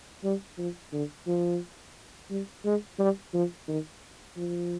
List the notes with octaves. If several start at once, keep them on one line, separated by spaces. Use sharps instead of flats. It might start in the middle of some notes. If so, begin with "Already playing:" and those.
G3
F3
D3
F3
G3
G#3
G3
F3
D#3
F3